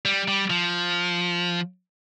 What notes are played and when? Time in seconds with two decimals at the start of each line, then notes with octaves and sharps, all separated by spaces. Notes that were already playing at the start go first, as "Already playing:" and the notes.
0.05 G3
0.28 G3
0.50 F3